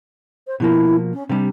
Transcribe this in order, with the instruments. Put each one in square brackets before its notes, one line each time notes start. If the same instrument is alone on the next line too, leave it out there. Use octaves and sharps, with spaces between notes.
[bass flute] C5
[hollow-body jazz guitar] B2 F3 A#3 [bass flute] E4
[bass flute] C#4
[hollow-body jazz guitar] C3 G3 [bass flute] D4